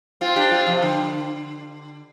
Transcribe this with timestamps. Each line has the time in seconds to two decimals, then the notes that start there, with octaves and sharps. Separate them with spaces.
0.21 C4 F4
0.36 D4 G4
0.52 C4 F4
0.66 C3 F3
0.82 D3